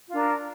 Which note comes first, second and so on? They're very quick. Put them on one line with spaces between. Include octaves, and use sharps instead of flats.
F4 D4 A#4